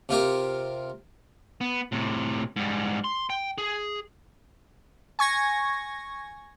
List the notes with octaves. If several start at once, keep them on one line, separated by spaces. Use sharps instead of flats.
C3 F4 G4 A#4
B3
A2 C3
G#2 G3
C6
G5
G#4
G#5 C#6 G#6 A#6